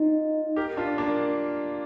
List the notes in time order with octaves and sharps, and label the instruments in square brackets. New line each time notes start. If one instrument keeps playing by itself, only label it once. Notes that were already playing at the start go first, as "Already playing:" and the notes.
Already playing: [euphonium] D#4 [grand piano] F4
[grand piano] G4 A#4
D4 F4
A#3 D4